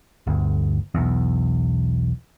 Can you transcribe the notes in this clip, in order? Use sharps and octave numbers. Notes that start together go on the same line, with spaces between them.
G1 D2
B1 E2